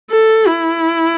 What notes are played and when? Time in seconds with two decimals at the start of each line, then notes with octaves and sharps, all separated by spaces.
0.11 A4
0.47 E4